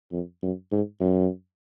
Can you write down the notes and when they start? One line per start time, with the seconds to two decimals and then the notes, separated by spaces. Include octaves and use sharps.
0.12 F2
0.43 F#2
0.72 G#2
1.00 F#2